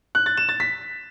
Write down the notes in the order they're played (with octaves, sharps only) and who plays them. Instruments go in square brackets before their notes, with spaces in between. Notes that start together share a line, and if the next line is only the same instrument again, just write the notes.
[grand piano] F#6
A6
E7
A6
B6